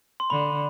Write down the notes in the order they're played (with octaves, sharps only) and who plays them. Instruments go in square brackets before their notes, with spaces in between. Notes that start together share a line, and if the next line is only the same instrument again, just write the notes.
[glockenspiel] C6
[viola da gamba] D3 [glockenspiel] B5